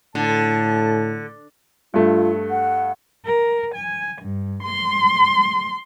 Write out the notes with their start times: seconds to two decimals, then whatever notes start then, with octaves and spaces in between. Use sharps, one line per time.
0.15 A2 D3 A5
1.94 G2 A3 F4
2.50 F#5
3.25 A#4
3.74 G#5
4.21 G2
4.63 C6